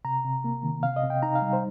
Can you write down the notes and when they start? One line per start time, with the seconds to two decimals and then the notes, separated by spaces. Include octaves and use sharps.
0.05 C3 A#5
0.24 C3
0.44 A#3
0.63 D#3
0.83 C3 F5
0.96 D#5
1.03 C3
1.10 G5
1.22 D#4 A#5
1.35 F5
1.42 G3
1.53 C5